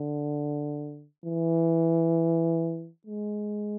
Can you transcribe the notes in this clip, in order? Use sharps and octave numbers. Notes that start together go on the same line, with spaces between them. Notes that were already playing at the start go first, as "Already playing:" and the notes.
Already playing: D3
E3
G#3